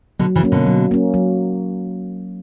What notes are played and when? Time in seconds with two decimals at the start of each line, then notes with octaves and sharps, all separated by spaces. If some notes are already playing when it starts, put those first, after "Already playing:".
0.19 B2 D3 F#3
0.35 C#3 E3
0.43 A#3 C#4
0.52 B2 D3
0.66 F#3
0.91 A#3 C#4
1.14 F#3